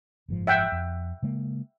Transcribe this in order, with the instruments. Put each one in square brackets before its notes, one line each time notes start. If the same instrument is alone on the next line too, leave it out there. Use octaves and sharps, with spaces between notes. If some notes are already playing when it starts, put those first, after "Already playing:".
[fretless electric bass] F#1 G#2 F3
[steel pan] E5 F#5 G5
[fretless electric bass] F2
C#3 G#3 A#3